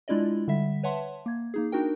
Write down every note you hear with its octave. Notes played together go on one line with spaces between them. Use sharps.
G#3 D4 E4 F4 D5 D#5
D3 G3 E5 B6
B4 C#5 E5 F#5 A5 C6
A#3 G#6
A#3 D#4 G#4
D4 D#4 F#4 A#4 G5